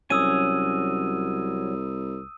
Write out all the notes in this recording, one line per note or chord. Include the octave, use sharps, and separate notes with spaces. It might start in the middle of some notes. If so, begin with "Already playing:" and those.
C2 F#3 C#4 G#5 D#6 E6 D#7